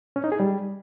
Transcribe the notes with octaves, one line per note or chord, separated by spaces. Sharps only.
C#4
D#4
G#4
G3